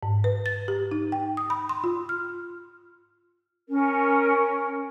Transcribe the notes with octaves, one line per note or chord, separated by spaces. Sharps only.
G#2
B4
A6
G4
D#4
G5
D#6
B5
C6
F4
F6
C#4 A#4